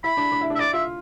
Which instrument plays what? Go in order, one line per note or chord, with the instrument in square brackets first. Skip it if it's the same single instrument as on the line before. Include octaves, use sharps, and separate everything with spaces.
[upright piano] E4 [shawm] B5
[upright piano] D4
D4
E4
D4
[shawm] E5
[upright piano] E4 [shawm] D5
[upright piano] F4 [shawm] E5